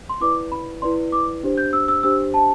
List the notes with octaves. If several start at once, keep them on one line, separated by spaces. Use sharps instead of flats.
C6
E4 B4 D5 D6
B5
E4 B4 D5 C6
D6
D4 G4 C5
G6
E6
E6
D4 G4 C5 E6
A5